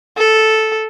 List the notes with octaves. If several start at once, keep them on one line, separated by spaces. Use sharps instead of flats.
A4